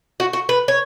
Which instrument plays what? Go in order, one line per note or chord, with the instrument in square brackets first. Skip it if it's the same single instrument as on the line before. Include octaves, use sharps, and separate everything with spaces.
[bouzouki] F#4
F#4
B4
C#5